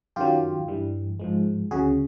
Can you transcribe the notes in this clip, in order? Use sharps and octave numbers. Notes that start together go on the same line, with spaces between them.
F#2 D#3 F#3 F4 G4
G2 E3 G3
G#2 F3 G#3
D2 C#3 F#3 F#4 G#4